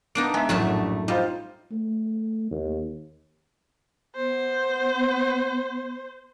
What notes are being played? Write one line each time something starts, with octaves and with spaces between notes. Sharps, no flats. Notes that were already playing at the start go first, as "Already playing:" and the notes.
A#3 B3 D4 D#4 D7
G#3 E5 G#5
A#1 F#2 A2 F#3 A3 A5
G3 D#4 F4 C5
A3
D#2
B3 C5